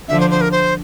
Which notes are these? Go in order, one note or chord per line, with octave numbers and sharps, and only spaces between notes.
D3 F3 E5
C5
C5
A#4
C5